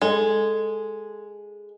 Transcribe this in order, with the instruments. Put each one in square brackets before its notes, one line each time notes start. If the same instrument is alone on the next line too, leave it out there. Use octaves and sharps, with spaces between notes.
[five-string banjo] G#3 [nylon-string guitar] A4